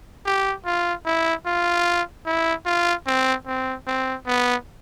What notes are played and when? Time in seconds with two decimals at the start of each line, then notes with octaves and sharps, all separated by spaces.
0.26 G4
0.65 F4
1.06 E4
1.46 F4
2.26 E4
2.66 F4
3.06 C4
3.46 C4
3.87 C4
4.27 B3